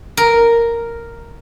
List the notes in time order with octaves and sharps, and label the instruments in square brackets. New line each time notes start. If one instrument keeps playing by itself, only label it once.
[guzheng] A#4